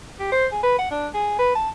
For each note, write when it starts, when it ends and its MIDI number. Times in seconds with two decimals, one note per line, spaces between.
0.19 0.27 67
0.32 0.46 72
0.52 0.60 68
0.63 0.77 71
0.78 0.89 78
0.91 1.07 62
1.14 1.36 68
1.38 1.53 71
1.55 1.70 81